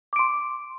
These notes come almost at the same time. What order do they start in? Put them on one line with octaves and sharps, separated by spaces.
D6 D7 C6